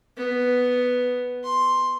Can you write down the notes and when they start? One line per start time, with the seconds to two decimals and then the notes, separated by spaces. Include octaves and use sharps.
0.17 B3
1.44 C6